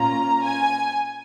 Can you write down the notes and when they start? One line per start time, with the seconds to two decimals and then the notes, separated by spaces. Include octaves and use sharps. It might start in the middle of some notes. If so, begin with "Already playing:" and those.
Already playing: A#2 A#3 C#4 F4 A#5
0.44 G#5